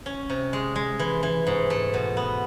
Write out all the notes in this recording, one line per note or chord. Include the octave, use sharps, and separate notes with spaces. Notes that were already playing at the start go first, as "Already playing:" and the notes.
C#4
C3
G#3
G#3
E3
E3
G#2
A3
B2
B3